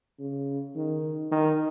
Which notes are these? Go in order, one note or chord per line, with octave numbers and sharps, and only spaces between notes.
C#3
D#3
D#3